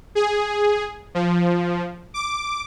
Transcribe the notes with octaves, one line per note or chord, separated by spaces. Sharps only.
G#4
F3
D6